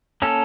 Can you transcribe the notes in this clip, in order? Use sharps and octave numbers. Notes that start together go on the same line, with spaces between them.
A#3 C#4 A4